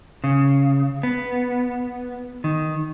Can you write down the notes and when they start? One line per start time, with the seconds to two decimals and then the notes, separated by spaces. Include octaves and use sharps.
0.24 C#3
1.03 B3
2.44 D#3